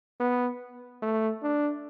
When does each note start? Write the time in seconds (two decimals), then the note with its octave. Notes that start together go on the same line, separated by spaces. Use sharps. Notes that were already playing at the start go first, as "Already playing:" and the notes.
0.20 B3
1.02 A3
1.43 D4